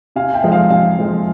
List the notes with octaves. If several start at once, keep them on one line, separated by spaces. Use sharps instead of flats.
C3 F5 G#5
E5 G5
F3 G#3
F5
C3 F5
F3 G#3